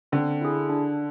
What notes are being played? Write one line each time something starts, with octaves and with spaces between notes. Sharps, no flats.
D3 C4
E4 G#4
D4